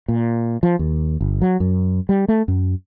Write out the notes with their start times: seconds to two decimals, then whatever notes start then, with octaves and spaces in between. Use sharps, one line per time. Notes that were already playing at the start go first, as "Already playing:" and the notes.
0.08 A#2
0.63 F3
0.79 D#2
1.21 G1
1.42 F#3
1.60 F#2
2.09 G3
2.28 A3
2.48 F#2